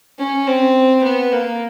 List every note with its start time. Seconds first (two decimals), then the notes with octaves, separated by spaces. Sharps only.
0.19 C#4
0.47 C4
1.04 B3
1.32 A#3